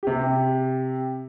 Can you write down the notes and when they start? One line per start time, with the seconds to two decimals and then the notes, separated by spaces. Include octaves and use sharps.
0.03 C3 G4